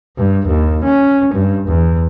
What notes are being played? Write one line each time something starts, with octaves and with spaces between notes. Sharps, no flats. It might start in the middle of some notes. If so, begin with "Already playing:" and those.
G2
D#2
C#4
G2
E2